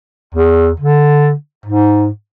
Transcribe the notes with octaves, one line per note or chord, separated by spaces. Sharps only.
E2
D3
G#2